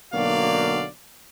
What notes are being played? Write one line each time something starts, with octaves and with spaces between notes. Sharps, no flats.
B1 D3 A#3 F#4 D5 F5